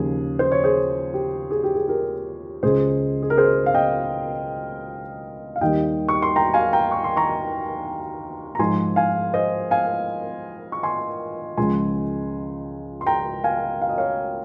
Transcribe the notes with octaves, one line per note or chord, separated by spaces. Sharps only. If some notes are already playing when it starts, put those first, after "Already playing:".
Already playing: D#2 C#3 F3 G#4
C5
C#5
G#4 C5
G4
G#4
G4
G#4
G4 A#4
C#2 C#3 G#3 G#4 C5
G#4
A#4
G#4 C5
F5
D#5 G5
F5
D#2 D#3 G3 D#5 G5
C#6
C6
G5 A#5
F5 G#5
G5 A#5
C#6
C6
A#5 C#6
A#5
G#2 F3 G#3 G#5 C6
F5 G#5
C5 D#5
F5 G#5
C#6
G#5 C6
C#2 C#3 F3 G#3 G#5 C6
C6
G5 A#5
F5 G#5
F5
D#5
C#5 F5